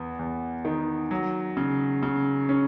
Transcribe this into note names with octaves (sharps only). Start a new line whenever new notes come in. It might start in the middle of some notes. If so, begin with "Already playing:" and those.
Already playing: E2 B3
E2
D#3
F#3
C#3
C#3
C#4